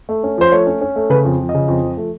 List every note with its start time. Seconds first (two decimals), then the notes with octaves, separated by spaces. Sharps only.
0.09 A3
0.24 C#4
0.38 F3 C5
0.52 A3 C#5
0.67 C#4
0.81 C#4
0.96 A3
1.10 C#3 B4
1.25 F2
1.39 F3
1.49 D#5
1.54 C#3
1.68 F2
1.83 F3
1.97 A3